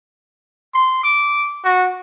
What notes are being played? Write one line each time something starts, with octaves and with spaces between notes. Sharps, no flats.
C6
D6
F#4